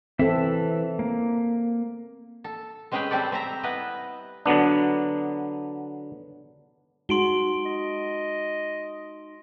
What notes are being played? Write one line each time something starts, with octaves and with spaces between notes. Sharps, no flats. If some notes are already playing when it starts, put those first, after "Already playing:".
E3 C4 A4 E5
A#3
A4
G#3 C4 C#4 G#4 B4 G5
G3 C4 G4 A4 D5
C4 E5 A#5
B3 E4 B4 D#5
D3 F#3 B3 D4
G#3 D#4 F#4 C6 D7 G7
D#5